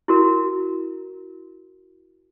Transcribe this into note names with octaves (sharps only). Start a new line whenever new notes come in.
E4 F#4 A#4